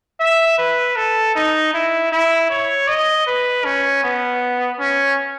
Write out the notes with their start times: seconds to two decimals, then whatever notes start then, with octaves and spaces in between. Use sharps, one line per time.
0.20 E5
0.58 B4
0.96 A4
1.35 D#4
1.74 E4
2.12 E4
2.51 C#5
2.88 D#5
3.27 B4
3.65 C#4
4.04 B3
4.80 C#4